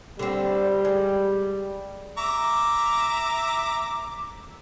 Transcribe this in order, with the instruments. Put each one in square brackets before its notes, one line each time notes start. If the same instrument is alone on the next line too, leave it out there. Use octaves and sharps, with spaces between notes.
[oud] D3 C4 [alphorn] G3
[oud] G#3
[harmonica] E5 A#5 D6